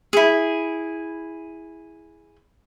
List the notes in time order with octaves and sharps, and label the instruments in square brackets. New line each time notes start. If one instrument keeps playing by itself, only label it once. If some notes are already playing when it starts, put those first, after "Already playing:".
[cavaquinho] E4 G#4